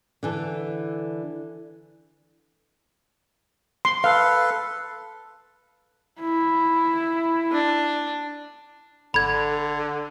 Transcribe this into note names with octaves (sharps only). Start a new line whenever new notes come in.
D3 E3 A4
C6
A4 B4 F5
E4
D4
G#1 D3 A4 B5 G#6